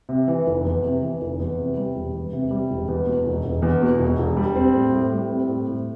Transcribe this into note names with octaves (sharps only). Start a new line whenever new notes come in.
C3
E3
F1
E2
C3
E3
F1
E2
C3
G3
E1
E2
C3
G3
E1
E2
B2
E1
E1
E2
B2
E1
E1
G3
C4
A2
A2
G3
C4
A2
A2